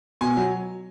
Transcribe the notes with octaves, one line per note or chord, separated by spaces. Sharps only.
B2 G#5
F#3